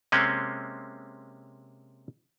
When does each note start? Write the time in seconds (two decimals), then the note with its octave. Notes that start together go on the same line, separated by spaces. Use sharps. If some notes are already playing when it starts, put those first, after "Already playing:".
0.12 C3 G#3 A#3 C4 C#4